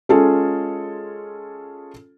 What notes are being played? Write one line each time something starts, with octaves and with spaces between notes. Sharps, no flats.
G#3 C#4 F4 G#4 A4